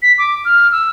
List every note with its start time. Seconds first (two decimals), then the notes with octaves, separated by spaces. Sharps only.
0.02 B6
0.18 D6
0.45 F6
0.72 E6